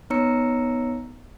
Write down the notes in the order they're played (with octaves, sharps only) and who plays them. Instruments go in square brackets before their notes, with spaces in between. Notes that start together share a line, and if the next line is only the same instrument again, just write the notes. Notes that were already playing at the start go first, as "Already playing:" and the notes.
[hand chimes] B3 D#4 C#5 A#5 E6 C#7